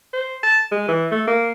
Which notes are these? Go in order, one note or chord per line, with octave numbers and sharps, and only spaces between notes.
C5
A5
G#3
E3
A3
A#3